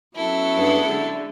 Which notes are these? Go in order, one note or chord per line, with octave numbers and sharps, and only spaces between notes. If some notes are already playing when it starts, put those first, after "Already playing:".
F#3 B3 C#4 E4 A4
G2 G#4 F#5
D3 G#3